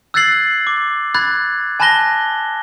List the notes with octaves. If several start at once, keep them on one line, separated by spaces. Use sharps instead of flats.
E6 F#6 G#6 A6 C7 F#7
D6
B5 F#6 G#6 A6
G#5 A5 B5 F#6 A#6 G7